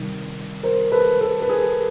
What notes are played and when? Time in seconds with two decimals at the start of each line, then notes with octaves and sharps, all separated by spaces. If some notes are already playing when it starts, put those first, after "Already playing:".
Already playing: C3 D#3 G3
0.63 A#4 C5
0.92 A4 B4
1.21 A4 B4
1.42 B4
1.49 G#4 A#4